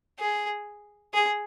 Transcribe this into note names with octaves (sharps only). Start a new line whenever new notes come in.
G#4
G#4